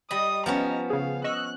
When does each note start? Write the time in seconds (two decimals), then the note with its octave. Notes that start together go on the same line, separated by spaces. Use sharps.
0.11 G3 D#5 B5 D#6
0.46 F3 B3 C#4 A#5
0.90 C#3 G#4 F5
1.24 D#5 C#6 E6 F#6